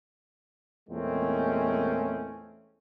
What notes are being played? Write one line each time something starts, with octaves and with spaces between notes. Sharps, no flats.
E2 A#2 G#3 A3 C4 C#4